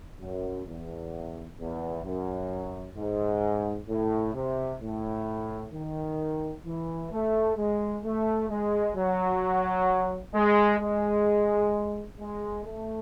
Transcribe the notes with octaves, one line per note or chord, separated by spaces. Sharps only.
F#2
E2
E2
F#2
G#2
A2
C3
A2
D#3
E3
A3
G#3
A3
G#3
F#3
G#3
G#3
G#3
A3